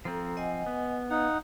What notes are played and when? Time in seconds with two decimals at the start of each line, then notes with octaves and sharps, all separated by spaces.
0.05 F3 C4 A4 A#5
0.37 D#5 F#5 G#5
0.66 B3
1.10 D#4 F5 F#5